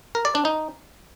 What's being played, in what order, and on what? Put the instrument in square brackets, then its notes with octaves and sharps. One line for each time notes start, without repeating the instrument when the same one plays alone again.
[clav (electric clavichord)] A#4
D5
D4
D#4